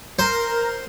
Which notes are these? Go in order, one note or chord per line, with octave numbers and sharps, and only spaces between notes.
A#4 C5